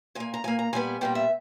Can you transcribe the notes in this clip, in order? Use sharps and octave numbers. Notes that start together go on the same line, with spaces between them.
A#2 A#3 G#5
A#5
A#2 A#3 G#5
A#5
A#2 G3 B3 G#5
A#2 G3 B3 G5
E5